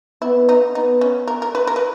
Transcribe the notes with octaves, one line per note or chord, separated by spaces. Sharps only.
B3 E4
D#4
B3 D#4
C#4
A#4
A#4
B4
A#4
B4